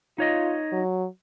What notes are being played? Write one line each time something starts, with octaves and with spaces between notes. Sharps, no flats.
D#4 F4 C#5 D#5
F#3